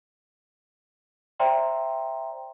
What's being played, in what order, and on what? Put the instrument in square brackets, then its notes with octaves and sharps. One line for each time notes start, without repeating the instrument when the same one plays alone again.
[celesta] C5 D5 E5 G5 A#5 C6